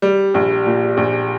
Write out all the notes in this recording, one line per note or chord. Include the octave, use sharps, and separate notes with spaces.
G3
A#1
A#2
A#1